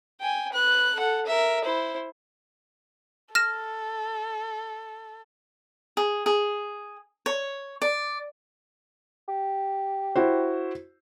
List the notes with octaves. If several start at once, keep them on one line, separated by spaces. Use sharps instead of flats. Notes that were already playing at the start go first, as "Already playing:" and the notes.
G5 G#5
B4 F#6
A4 F#5
A#4 E5
E4 C5
A4 F6 A#6 E7
G#4
G#4
C#5
D5
G4
E4 F#4 C5